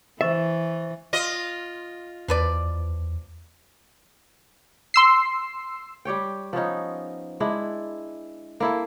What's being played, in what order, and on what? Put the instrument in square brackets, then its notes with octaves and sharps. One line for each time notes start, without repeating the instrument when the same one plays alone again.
[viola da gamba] E3 [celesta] C5 C#6 A6 [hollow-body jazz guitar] E5
[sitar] F4 D#5
[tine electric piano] E2 [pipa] F3 B4 D5
[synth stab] C6 E6 C7
[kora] G3 G4 C#5 G5
F3 B3 C#4 D#4
G#3 D4 E4
A#3 E4 A4